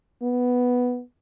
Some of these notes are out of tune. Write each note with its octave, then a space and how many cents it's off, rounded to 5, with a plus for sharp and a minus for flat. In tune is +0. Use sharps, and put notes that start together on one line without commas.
B3 +0